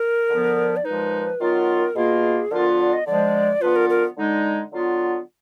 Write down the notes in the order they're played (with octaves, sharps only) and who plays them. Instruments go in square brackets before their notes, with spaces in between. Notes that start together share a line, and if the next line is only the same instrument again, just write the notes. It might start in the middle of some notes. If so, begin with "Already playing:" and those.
Already playing: [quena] A#4
[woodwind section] D3 F3 B3
[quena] D5
[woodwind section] A#2 F3 G#3 D#4 [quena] B4
[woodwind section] D#3 F#3 B3 F4 [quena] A#4
[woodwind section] B2 A#3 F4 [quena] G#4
[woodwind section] D3 F3 B3 F4 [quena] A#4
[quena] D5
D#5
[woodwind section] D3 F3 G#3 [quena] D5
[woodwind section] D3 F3 B3 F4 [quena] B4
[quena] A#4
A#4
[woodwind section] D3 G#3 D#4
D3 F#3 B3 F4